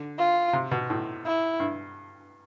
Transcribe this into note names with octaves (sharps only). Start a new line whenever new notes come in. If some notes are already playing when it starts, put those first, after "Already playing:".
Already playing: D3
F4
C3
B2
A2
E4
G2